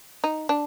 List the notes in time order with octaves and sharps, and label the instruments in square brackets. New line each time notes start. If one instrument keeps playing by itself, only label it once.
[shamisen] D#4
D4